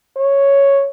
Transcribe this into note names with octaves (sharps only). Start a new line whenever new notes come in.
C#5